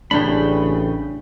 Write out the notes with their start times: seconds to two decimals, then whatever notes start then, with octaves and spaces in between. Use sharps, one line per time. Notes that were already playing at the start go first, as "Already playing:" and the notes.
0.11 A1 C#3 D4 G5 B5